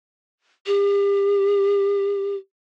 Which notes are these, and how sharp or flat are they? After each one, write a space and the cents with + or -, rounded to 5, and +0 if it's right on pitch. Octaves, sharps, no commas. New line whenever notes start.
G4 +35